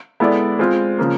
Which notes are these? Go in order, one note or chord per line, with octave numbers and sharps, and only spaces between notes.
G#3 B3 E4 A4 D5
G#3 C4 F4
C#3 F3 A#3